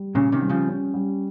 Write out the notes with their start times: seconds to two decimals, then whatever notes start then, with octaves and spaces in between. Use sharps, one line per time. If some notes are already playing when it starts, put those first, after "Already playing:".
Already playing: G3
0.15 A#2 C#3 C#4
0.32 C3 D#3
0.41 G3
0.49 C#3 F3
0.67 C#4
0.94 G3